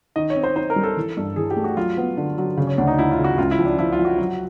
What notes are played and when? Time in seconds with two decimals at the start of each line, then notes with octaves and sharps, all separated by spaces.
0.16 D#3 D#5
0.30 C#5
0.36 C4
0.44 C5
0.56 D#4 C5
0.70 A#4
0.76 G3
0.83 A4
0.97 E3
1.17 G2
1.36 E3 G#4
1.51 G4
1.56 A3
1.64 F#4
1.77 F#3 F4
1.97 B3
2.17 D3
2.38 F#3
2.57 C#3
2.67 C#4
2.78 D2 D4
2.87 D#4
2.98 D2 E4
3.11 F4
3.18 C#3
3.24 F#4
3.38 C#2 F4
3.51 E4
3.59 F3
3.65 D4
3.78 F3 E4
3.92 F4
3.99 F3
4.05 F#4
4.18 F#3